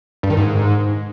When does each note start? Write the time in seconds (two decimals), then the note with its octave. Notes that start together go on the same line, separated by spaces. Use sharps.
0.23 G2
0.30 D#3
0.37 G#2